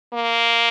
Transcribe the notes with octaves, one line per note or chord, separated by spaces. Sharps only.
A#3